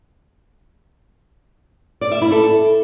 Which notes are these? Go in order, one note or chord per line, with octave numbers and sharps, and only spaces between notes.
D5
E5
E4
A4